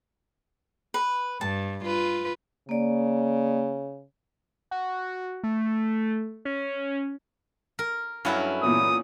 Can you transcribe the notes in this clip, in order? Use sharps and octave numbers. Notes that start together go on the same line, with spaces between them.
B4
G2 A5
F4 B4
C#3 A#3 D5
F#4
A3
C#4
A#4
G2 F#3 C#4 E4 F#4 A4
A#2 E3 B3 D#6